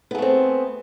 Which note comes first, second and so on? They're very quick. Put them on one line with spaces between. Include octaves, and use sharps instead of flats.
B3 G#4 A3 C4